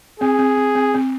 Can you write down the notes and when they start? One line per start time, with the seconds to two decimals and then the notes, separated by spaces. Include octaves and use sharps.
0.20 C4 G#4
0.39 C4
0.57 C4
0.75 C4
0.94 C4